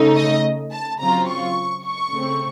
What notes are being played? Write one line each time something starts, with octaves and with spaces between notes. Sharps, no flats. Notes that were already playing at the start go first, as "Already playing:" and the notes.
Already playing: C#3 A3 D#4
D#5
A5
C#3 F#3 C4 F4 A#5
C#6
C#6
C#3 A3 C4